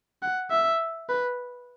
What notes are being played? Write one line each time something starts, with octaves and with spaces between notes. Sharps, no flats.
F#5
E5
B4